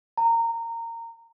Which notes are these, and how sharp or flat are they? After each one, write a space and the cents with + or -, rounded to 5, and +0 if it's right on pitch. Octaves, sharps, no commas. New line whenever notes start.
A#5 -20